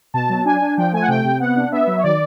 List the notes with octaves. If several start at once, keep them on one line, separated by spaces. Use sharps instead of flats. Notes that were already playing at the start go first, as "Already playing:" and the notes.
B2 A5
F#3
D4 G#5
D4
F3 G5
A3 G#5
F#5
C3 G5
C3
B3 F#5
D4
B3 E5
F#3
C#5
D#3 D5